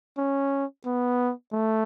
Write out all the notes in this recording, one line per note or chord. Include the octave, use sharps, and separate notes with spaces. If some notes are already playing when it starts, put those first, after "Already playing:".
C#4
B3
A3